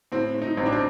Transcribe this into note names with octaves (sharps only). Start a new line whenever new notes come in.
A2 C4
A2
D#4
A1 C4
D4
C4